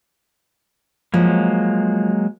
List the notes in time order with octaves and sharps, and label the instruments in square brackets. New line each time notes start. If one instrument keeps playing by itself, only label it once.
[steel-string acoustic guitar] F3 [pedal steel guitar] F#3 G#3 A#3